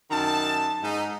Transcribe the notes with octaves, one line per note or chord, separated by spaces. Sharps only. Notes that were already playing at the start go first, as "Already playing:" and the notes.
F#2 D#3 A5
G#2 D#4